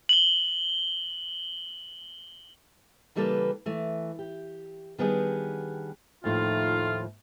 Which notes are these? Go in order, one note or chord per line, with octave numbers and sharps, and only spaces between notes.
F#7 G7
C#3 E3 G3 A#3 A4 B4
E3 A3
G4
D#3 G3 B3 D4 G4 G#4
D#2 A2 F3 A3 D#4 F4